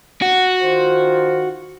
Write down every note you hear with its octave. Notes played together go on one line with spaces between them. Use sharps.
F#4
D#3 F4 C5